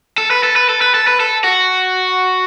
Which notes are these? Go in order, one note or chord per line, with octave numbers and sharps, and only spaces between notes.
A4
B4
A4
B4
A4
B4
A4
B4
A4
F#4